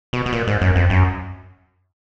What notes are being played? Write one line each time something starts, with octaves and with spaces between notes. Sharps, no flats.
B2
B2
A#2
G#2
F#2
F2
F#2